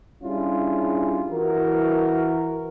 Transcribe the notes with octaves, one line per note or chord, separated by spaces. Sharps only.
G3 C#4 D4 E4 F4 G#4
E3 F#4 A#4